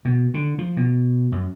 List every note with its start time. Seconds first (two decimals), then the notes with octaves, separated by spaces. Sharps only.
0.05 B2
0.34 D3
0.58 F3
0.77 B2
1.32 F#2